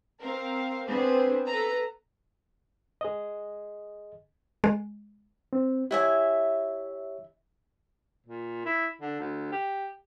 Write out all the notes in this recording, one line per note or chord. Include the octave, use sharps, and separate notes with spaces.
C4 A#4 F5
B3 C4 D4 G#4 B4 C5
A4 B4 A#5
G#4 D#5
G#3
C4
E4 G4 C#5 E5 G#5
A#2
E4
D3
D2
G4